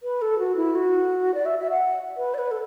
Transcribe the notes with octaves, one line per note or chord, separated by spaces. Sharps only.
B4
A4
F#4
E4
F#4
D5
E5
E5
F#5
B4
D5
B4
A4